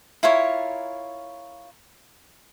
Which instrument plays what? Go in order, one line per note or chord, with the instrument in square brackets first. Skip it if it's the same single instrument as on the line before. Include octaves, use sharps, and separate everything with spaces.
[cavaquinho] E4 F4 A#4 C#5